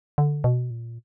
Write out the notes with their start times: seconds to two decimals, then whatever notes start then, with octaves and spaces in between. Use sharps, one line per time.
0.18 D3
0.44 B2
0.71 A#2